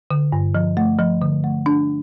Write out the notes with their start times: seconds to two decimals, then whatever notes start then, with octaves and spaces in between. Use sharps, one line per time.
0.11 D3
0.32 G2
0.55 F3
0.77 A3
0.99 F3
1.22 D3
1.44 A3
1.66 D4